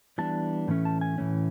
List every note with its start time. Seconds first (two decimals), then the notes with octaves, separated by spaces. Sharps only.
0.18 E3 G3 B3 D4 A5
0.68 A2 E3 A3 C#4
0.85 A5
1.01 G#5
1.18 A2 E3 A3 C#4